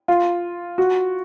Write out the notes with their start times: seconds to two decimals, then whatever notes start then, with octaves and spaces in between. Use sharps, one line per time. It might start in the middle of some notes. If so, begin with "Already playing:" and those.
0.08 F4
0.78 F#4